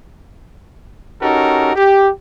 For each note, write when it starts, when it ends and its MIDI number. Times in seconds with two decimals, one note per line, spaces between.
1.21 1.74 61
1.21 1.74 63
1.21 1.74 66
1.21 1.74 67
1.21 1.74 69
1.21 1.74 70
1.75 2.08 67